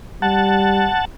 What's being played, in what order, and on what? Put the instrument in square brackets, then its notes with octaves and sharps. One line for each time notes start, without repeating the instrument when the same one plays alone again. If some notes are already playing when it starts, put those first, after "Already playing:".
[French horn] G3 [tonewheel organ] F#5 A5